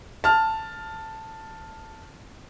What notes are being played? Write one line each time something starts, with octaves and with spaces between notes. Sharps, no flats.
A5 F6